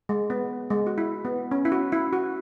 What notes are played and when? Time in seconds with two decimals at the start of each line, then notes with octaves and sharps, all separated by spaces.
0.09 G#3
0.30 B3
0.70 G#3
0.87 F#4
0.98 E4
1.25 B3
1.51 C#4
1.65 E4
1.72 F#4
1.92 E4
2.13 F#4